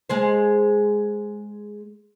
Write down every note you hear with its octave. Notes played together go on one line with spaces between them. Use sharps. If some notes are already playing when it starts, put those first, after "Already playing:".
G#3 G#4 C5